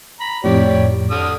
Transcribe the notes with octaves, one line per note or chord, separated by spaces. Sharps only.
A#5 B5
F2 A2 G4 C#5 D5
D3 D#6 F6